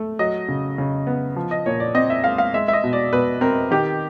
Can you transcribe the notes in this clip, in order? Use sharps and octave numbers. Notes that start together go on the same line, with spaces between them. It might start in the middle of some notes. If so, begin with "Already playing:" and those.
Already playing: A3
F#3 D#5
C#3
C#3
B3
F3
D#5
A#2 C#5
D5
C4 D#5
E5
G#3 F5
F5
G#3 E5
E5
D#5
B2
D5
B2 B4
C4 A#4
D#3 G4